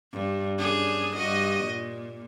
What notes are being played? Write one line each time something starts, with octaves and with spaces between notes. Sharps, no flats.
G2
F#2 D4 G#4
G2 F#4 D#5
A#2